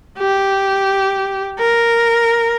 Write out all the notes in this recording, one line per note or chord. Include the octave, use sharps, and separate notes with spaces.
G4
A#4